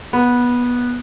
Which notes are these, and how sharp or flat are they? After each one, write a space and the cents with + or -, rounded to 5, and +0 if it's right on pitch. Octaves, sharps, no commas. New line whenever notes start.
B3 -15